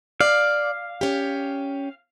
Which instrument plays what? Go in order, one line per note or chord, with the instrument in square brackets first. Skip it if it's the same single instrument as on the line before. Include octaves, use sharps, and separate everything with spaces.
[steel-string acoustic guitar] D5 [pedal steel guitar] F5
[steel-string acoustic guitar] C#4 G4